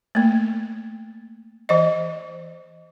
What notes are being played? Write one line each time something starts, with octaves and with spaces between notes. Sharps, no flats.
A3 A#3
E3 C5 D#5